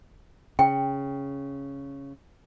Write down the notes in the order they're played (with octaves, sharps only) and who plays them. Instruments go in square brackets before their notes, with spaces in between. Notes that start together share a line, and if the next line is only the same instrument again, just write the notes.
[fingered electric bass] C#3 [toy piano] G5